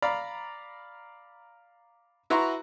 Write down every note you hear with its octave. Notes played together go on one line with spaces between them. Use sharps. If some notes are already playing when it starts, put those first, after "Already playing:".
D5 F5 A#5 B5
E4 F#4 B4 A#5 C6 C#6